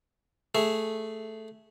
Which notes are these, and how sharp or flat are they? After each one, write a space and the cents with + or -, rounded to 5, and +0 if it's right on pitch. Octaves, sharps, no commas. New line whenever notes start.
A3 +0 G#4 +0